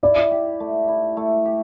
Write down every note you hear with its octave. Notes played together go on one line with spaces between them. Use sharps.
E4 D5
G4
A3
E4
A3
G4